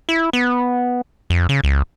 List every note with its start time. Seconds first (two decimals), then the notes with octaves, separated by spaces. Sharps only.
0.09 E4
0.33 B3
1.30 F2
1.49 C#3
1.64 C#2